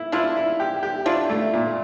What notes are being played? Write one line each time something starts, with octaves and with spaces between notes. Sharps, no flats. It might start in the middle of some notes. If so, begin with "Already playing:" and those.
Already playing: E4
D4 E4 F4
E4
G4
G4
D4 E4 F4
A3
A#2